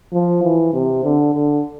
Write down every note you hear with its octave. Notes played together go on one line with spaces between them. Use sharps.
F3
E3
C3
D3
D3